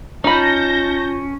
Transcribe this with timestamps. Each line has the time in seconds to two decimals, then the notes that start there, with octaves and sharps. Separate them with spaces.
0.24 C#4 D#4 F4 A5 B5 G6 A#6